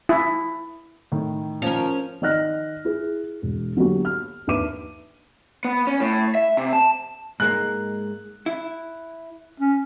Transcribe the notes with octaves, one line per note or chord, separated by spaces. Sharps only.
E4
A2 D#3
F3 C#4 A#4
D#3 D5 D#5 F6 F#6 A#6
E4 G#4
E1
D3 F#3 A#3 B3 F#4 G4
F6
D#2 D4 B4 E5 D6 D#7
B3
C#4
A2
E5
C3
A5
G#2 G#3 A#3 F#6
E4
C#4